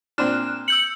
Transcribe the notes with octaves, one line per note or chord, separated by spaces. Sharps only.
A#2 C4 D4 F6 F#6 E7
E6 G6 C#7 F#7